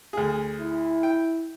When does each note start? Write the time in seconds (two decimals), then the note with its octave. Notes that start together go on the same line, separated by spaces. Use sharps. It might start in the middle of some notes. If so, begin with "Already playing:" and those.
0.13 D2 G#4
0.60 E4
1.03 G5